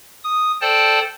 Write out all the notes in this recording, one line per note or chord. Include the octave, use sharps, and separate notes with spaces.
D#6
A4 C5 D5 G5 A5